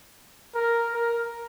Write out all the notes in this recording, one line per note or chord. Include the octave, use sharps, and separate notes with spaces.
A#4
A#4